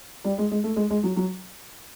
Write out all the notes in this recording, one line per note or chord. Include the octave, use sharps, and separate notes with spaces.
G3
G#3
G#3
A3
G#3
G#3
F#3
F#3